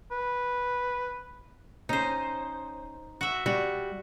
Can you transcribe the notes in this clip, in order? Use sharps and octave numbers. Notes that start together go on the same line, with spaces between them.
B4
C#4 D#4 C5
F#4 E5
G3 F#4